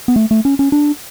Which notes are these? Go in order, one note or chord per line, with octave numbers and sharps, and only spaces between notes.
B3
A3
A3
C#4
C#4
D4